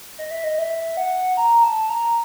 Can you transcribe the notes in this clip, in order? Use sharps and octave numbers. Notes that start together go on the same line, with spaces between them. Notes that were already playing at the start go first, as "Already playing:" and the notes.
D#5
E5
D#5
E5
F#5
A#5
A5
A#5